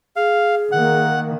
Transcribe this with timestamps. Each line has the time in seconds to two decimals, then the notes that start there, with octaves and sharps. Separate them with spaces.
0.16 G#4 F5
0.72 D#3 A#3 F#5